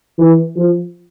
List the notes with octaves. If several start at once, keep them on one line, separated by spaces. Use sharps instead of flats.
E3
F3